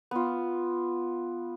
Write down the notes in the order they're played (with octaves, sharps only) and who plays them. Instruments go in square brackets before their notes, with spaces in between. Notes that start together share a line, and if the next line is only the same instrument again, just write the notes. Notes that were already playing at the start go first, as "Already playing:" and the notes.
[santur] B3 F4